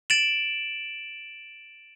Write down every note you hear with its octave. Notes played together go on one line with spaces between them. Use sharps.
A6 D7 E7 F#7